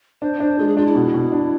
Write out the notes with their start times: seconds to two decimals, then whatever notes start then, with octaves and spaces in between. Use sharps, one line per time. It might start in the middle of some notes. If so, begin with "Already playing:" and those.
0.22 D4 C5
0.40 D4 C5
0.59 G#3 F4
0.68 G#4
0.77 D4 F4
0.86 E4
0.95 B2
1.14 B2
1.32 D4